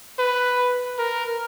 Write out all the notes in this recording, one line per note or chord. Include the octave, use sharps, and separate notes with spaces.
B4
A#4